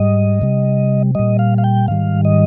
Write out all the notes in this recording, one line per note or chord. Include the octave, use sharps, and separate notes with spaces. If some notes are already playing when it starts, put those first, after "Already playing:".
Already playing: G#2 G3 D#5
C3 G3
A#2 G3 D#5
F5
F5
G5
G#2 D#3 G3 F5
D#5